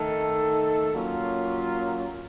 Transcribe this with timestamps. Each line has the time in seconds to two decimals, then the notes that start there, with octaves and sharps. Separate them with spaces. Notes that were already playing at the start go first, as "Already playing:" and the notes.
Already playing: D#3 A3 D#4 A4
0.93 F#3 A#3 C#4 F4